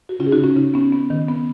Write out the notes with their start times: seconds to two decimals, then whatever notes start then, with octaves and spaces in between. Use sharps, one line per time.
0.09 F#4
0.19 C#3 C#4 F4
0.26 G#4
0.32 D#4 F#4
0.38 C#3
0.43 C#4 F4
0.56 C#3 D#4
0.74 B3 C#4
0.92 B3
1.10 D#3
1.29 B3